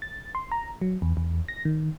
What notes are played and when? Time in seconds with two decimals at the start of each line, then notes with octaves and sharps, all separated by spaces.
0.02 A6
0.35 C6
0.52 A#5
0.82 F#3
1.02 E2
1.17 E2
1.48 A#6
1.65 D#3